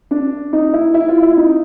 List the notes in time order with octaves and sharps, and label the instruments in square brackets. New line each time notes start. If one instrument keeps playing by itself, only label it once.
[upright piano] D4
D#4
E4
E4
F4
E4
D#4